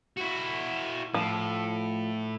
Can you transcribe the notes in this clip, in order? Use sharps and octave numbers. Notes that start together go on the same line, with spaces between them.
E4 F#4
A2 F3